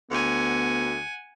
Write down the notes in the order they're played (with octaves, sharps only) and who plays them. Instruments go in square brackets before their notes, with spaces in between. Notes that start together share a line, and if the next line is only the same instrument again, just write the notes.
[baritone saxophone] D2 [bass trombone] B3 [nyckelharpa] F#5 G#5